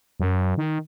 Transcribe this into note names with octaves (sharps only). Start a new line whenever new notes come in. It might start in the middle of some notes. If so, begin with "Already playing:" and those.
F#2
D#3